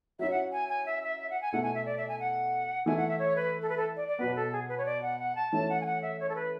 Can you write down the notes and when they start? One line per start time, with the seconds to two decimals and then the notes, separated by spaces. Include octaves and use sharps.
0.19 F#3 C#4 E4 E5
0.30 F#5
0.52 G#5
0.68 G#5
0.86 E5
1.03 E5
1.20 E5
1.30 F#5
1.41 G#5
1.53 B2 A3 E4 F#5
1.63 G#5
1.74 E5
1.85 D5
1.97 E5
2.08 G#5
2.20 F#5
2.86 E3 A3 E4 G#5
2.97 F#5
3.08 E5
3.19 C#5
3.36 B4
3.61 A4
3.69 B4
3.77 A4
3.96 D5
4.08 D5
4.19 B2 F#3 B3 B4
4.35 A4
4.52 G#4
4.68 B4
4.78 C#5
4.85 D5
5.02 F#5
5.20 F#5
5.35 A5
5.52 E3 A3 C#4 E4 A5
5.69 F#5
5.81 G#5
5.85 F#5
6.02 E5
6.20 C#5
6.29 A4
6.35 B4